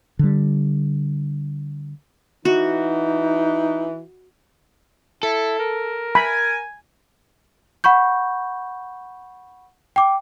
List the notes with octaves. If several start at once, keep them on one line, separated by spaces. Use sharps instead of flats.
D3 G3
E3 D#4 F#4
E4 A4
A#4
G#5 B5
F#5 B5 C#6 G6
G5 D6